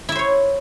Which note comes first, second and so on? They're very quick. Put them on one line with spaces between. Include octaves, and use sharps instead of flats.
E4 E5 C5 C#5